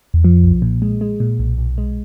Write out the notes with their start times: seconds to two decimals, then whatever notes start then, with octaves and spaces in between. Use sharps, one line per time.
0.14 E2
0.24 F2 F3
0.44 B1
0.62 A#2
0.82 G#3
1.01 G#3
1.20 A#2
1.39 B1
1.58 B1
1.78 G#3